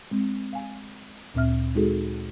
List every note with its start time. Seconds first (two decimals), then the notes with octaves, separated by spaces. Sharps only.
0.11 G#3 C4
0.53 F5 G#5
1.34 D2 A#2 C4 E5 F6
1.75 G#3 D#4 F#4 G#4 A4